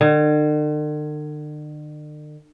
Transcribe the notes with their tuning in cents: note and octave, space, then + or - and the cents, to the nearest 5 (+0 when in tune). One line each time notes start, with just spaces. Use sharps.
D3 +45